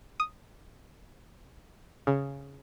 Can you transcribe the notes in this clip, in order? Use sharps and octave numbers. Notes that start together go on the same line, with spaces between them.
D#6
C#3